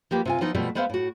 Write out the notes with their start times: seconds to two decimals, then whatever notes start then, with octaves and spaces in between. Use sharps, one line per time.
0.11 F3 A#3 G4 B4
0.25 C3 F4 G#5
0.41 F3 B3 D#4 E4
0.55 B2 F3 G3 A3 B3
0.75 G#3 B3 C5 E5 F5
0.90 A2 F#4